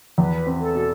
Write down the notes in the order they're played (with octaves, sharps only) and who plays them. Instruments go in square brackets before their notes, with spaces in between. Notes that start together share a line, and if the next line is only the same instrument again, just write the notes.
[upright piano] E2 [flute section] B4
[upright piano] C4
[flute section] A4
[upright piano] B2